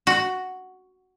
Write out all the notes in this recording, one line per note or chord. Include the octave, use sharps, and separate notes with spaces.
F#4